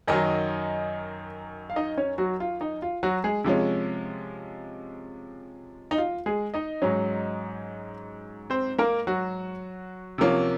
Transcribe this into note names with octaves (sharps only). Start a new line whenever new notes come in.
F#2 D#3 F#3 D#4 D#5
F5
D#4 D#5
C#4 C#5
F#3 F#4
F4
D#4
F4
F#3 F#4
G#3 G#4
C3 F3 G#3 C#4
D#4
F4
G#3 G#4
D#4 D#5
G#2 F#3 C#4
C4 C5
A#3 A#4
F#3 F#4
C3 F3 A#3 C#4